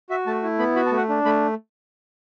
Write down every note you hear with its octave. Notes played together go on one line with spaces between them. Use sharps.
F#4 E5
A3 A5
E4
B3 B5
F#4 B5
A5
A3
F#5
D4
A3 B5